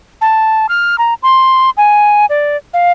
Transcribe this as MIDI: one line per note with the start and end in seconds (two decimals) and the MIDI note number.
0.21 0.67 81
0.69 0.96 89
0.98 1.14 82
1.23 1.70 84
1.77 2.26 80
2.29 2.57 74
2.74 2.92 77